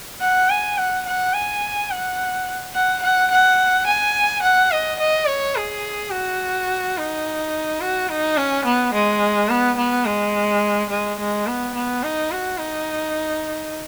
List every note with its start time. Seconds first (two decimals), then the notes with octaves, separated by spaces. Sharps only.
0.21 F#5
0.50 G#5
0.78 F#5
1.06 F#5
1.34 G#5
1.90 F#5
2.74 F#5
3.03 F#5
3.31 F#5
3.87 G#5
4.43 F#5
4.71 D#5
4.99 D#5
5.28 C#5
5.56 G#4
6.11 F#4
6.97 D#4
7.81 F#4
8.09 D#4
8.37 C#4
8.65 B3
8.94 G#3
9.49 B3
9.77 B3
10.06 G#3
10.90 G#3
11.19 G#3
11.47 B3
11.75 B3
12.03 D#4
12.31 F#4
12.58 D#4